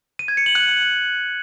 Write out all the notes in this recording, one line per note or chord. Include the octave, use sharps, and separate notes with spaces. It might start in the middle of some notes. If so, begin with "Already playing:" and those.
D#7
G#6
C#7
F#7
F#6